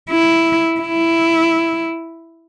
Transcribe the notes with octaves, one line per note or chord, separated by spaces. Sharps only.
E4
E4